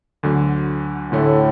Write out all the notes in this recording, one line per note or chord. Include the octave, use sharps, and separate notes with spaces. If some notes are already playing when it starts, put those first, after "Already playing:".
D2 D3 F#3
D2 A2 D3 A3 E4 A4